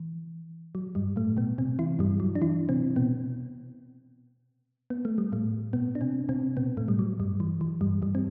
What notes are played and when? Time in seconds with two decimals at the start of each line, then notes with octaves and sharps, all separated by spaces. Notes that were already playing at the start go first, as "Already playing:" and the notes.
Already playing: E3
0.75 F#3
0.95 G2 G3
1.16 A2 A3
1.37 B2 B3
1.58 C3 C4
1.79 E3 E4
1.99 G2 G3
2.20 F#3
2.35 D4
2.42 E3 E4
2.69 C3 C4
2.96 B2 B3
4.90 B3
5.05 A3
5.18 G3
5.32 A2 A3
5.73 B2 B3
5.95 D4
6.01 C3 C4
6.29 C3 C4
6.57 B2 B3
6.77 A2 A3
6.88 G3
6.99 F#3
7.20 G2 G3
7.40 E3
7.61 E3
7.81 G2 G3
8.02 G2 G3
8.15 C4